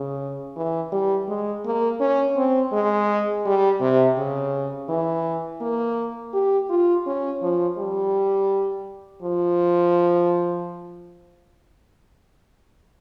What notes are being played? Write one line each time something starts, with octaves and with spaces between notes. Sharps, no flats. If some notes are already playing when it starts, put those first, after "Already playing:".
Already playing: C#3
E3
G3
G#3
A#3
C#4
C4
G#3
G3
C3
C#3
E3
A#3
G4
F4
C#4
F3
G3
F3